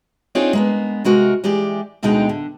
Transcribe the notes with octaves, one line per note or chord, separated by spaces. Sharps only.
C4 D4 D#4 F4 G#4 C#5
G#3 A#3 B3
C3 G#3 F#4 A#4
E3 G#3 G4 D5
D2 B2 D3 G#3 D#4 G5
D3